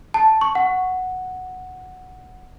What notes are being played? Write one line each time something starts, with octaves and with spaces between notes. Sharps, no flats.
A5
C#6
F#5